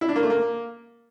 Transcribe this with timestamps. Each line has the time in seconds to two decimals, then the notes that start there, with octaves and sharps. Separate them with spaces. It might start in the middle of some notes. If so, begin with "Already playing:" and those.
0.01 E4
0.08 D4
0.16 A#3
0.23 A3
0.30 A#3